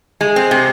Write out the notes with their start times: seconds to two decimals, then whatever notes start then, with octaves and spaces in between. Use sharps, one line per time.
0.21 G#3
0.36 C4
0.51 C3